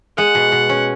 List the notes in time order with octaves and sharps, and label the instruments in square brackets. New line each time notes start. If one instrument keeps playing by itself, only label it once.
[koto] G#3 [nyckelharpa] F#5
[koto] B2
B2
C#4